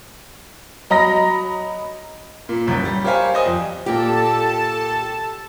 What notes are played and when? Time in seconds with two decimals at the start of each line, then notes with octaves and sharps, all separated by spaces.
0.90 F#3 D#5 A#5 B5 A#6
2.49 A#2
2.67 F1 C2 F#2
2.85 G3
3.04 G4 A#4 C5 C#5 F5 G#5
3.34 C5 D5 D#5 F5 G#5 D#6
3.46 F2
3.86 A#2 G4 A4 A5